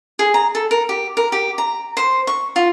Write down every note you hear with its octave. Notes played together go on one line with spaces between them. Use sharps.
G#4
A#5
A4
A#4
G4
A#4
G4
A#5
C5
C#6
F4